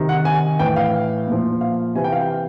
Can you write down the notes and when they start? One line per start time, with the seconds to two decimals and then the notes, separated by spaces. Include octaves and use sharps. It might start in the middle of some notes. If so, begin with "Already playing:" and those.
Already playing: C3 D#3
0.09 F#5
0.25 G#5
0.59 A2 E3 G5
0.76 F5
1.27 A#2 F3
1.61 F5
1.95 C3 E3 G#5
2.04 G5
2.13 F5
2.21 G5